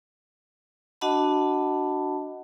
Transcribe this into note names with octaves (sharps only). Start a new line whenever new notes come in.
D4 F#4 D#5 F#5 A5 B5